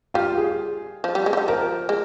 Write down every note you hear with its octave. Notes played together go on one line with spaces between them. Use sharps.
G3 F4
G#4
F3
G3
G#3
F3
G3
F3 A#4
G#3